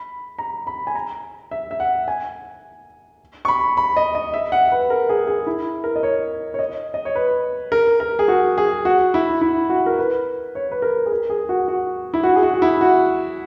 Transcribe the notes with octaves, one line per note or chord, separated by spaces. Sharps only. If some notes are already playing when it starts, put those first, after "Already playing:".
Already playing: B5
A#5
B5
G#5
A#5
E5
E5
F#5
G#5
C#6
B5
B5
D#5
D#5
E5
F#5
B4
A#4
G#4
G#4
E4
A#4
D#5
C#5
C#5
D#5
D#5
C#5
B4
A#4
A#4
G#4
F#4
G#4
F#4
E4
E4
F#4
A#4
B4
C#5
B4
A#4
G#4
A#4
G#4
F#4
F#4
E4
F#4
G#4
F#4
F#4
E4
F#4